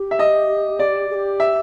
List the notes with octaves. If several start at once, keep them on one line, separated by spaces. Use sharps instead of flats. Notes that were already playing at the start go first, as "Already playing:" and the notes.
Already playing: G4
E5
D#5
D5
G#4
G4
E5